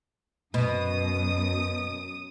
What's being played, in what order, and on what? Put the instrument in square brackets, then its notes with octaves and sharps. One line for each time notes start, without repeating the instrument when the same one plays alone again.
[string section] F#2 D#6 [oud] B2